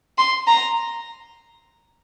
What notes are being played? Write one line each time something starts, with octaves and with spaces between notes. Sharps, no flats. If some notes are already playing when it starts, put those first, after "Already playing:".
C6
A#5